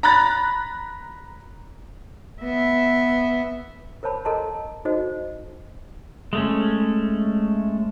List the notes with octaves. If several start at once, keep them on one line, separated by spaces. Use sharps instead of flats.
A#5 B5 F#6 A6
B3 E5
A#4 C5 C#5 A5 B5
A4 A#4 D#5 A5 A#5 C6
D#4 F#4 A4 C5 D#5
G#3 A3 C#4